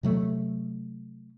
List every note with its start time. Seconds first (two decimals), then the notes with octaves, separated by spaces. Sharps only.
0.03 C3 F#3 A3